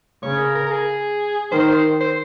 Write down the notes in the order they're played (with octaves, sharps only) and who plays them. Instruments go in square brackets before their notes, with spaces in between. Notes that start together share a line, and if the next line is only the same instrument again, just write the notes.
[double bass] C#3 [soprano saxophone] C#5
[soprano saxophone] A#4
A#4
A#4
G#4
[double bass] D#3 [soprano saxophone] C5
[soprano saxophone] C5
C5